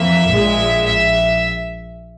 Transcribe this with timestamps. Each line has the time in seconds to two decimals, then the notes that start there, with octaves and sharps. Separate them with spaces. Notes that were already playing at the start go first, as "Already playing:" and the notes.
Already playing: F2 E3 A#3 E5
0.27 A#1 A#2 G#3
0.85 A#1 E5